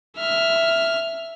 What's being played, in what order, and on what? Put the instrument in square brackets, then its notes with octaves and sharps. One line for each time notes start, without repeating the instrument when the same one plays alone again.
[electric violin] E5 F6